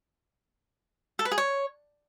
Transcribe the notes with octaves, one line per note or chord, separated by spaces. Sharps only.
A4
B4
G#4
C#5